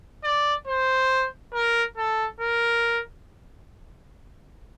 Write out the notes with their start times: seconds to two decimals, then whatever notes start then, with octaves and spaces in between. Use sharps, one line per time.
0.24 D5
0.67 C5
1.54 A#4
1.97 A4
2.40 A#4